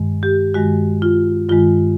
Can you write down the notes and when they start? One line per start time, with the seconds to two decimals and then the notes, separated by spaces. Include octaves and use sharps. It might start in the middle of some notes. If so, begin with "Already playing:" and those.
Already playing: G2 D#3 G#3
0.23 G4
0.54 G2 D#3 G#3 F#4
1.02 F4
1.49 G2 D#3 G#3 F4